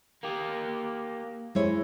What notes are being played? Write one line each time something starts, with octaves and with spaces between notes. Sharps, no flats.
A#3 G4
G#3 E4 C#5